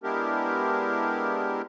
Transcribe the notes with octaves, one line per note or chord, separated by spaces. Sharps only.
G#3 B3 D4 E4 G4 A#4